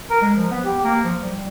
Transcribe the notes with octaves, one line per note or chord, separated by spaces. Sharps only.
A#4
G#3
F3
B3
G4
A#3
F3
G3